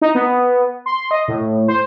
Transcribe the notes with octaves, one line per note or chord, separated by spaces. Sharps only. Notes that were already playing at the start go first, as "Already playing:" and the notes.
D#4
B3
C6
D#5
A2
C5